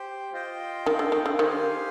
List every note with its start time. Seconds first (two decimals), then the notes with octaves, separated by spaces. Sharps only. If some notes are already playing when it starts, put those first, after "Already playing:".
Already playing: G4 C5 G5
0.33 F4 C5 D#5 G5
0.86 D#3
0.99 D3
1.12 D#3
1.26 D3
1.39 D#3 G4 C5 F5 G#5